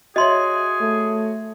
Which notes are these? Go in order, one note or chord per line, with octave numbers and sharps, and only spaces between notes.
F#4 G#4 C#5 D#5 E5 C6
A3